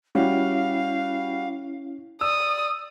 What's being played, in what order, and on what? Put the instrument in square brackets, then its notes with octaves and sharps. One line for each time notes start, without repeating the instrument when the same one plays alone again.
[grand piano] G3 F#4 [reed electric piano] C#4 E4 [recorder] F5
[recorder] D5 [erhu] D#6 [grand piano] E6